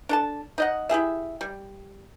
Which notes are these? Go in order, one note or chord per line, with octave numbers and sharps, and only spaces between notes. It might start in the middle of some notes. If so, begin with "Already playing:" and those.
D4 A4 A5
D#4 D#5 F#5
E4 G4 G#4 E5
G3